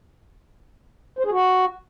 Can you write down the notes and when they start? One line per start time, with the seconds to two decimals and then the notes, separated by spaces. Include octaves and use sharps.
1.19 C5
1.25 G#4
1.31 F#4